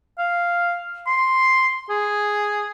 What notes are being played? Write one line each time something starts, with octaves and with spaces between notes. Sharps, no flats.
F5
C6
G#4